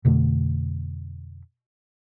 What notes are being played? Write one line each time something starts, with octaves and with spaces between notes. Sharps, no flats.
F2 B2 D3 A3